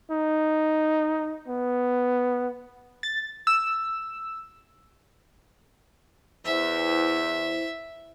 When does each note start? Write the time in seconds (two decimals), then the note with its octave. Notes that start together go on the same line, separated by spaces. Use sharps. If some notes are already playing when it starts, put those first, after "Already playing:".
0.10 D#4
1.48 B3
3.03 A6
3.47 E6
6.45 E2 E4 C5 E5 E6